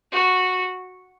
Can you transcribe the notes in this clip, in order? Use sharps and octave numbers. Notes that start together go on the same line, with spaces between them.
F#4